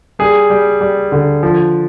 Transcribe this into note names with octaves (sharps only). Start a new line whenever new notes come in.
G3 G#4
G3
G3
D3
F3